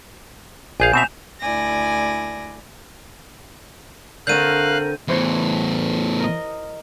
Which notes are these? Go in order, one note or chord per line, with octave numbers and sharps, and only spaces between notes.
A#1 G#4 F5 G#5 G6
B2 C4 E5 E7 F7
D2 E4 D5 G#5 A#6
D3 A3 C4 A#4 F5 F#6 G6 D#7
E2 A2 E3 C5 C#5
A#4 D#5